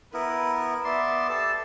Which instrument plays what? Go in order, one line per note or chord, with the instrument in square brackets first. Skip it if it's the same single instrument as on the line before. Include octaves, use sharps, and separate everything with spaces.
[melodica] B3 E4 A#4 [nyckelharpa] B4
[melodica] B3 D5 C6 [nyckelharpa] E5
[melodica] G4 A4 A5